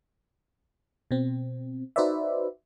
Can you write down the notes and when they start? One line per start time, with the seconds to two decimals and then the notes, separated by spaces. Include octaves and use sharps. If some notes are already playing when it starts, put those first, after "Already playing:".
1.11 B2 C4
1.96 D#4 F#4 B4 C5 D5 E5